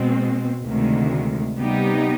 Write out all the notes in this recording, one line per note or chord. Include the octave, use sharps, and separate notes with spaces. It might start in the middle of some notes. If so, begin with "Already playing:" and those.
Already playing: B2 G#3 C4
D2 C3 D#3 G#3
C3 G3 B3 D#4 G4